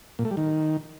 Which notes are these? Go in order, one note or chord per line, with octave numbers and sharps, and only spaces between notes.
A#2
A3
G3
D#3